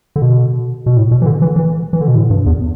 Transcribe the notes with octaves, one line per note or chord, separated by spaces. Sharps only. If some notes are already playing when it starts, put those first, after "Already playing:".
D3
B2
B2
A2
B2
E3
D3
E3
E3
E3
D3
B2
A2
G2
E2